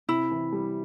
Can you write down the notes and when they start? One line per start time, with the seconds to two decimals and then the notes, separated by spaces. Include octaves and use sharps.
0.09 C3 E4
0.31 E3
0.53 G3